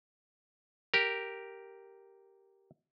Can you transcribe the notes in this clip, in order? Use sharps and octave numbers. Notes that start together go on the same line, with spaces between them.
G4 A#4